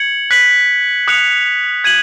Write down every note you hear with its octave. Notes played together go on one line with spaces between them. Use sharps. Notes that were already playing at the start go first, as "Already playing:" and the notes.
Already playing: G#6 C#7 F#7
F#6 B6 F#7
D#6 F#6 C#7 F7
G#6 D#7 F#7